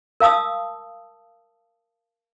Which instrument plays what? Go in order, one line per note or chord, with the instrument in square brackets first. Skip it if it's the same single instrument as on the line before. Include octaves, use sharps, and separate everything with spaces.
[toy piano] A#4 F5 A5 D#6 E6